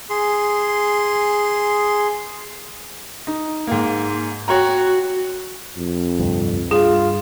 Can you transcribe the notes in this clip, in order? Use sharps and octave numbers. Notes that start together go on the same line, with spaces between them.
G#4 C6
D#4
G#2 A#3
F#4 C#5 G5 A#5
F2
D2 G2 C3
G2 F4 G#4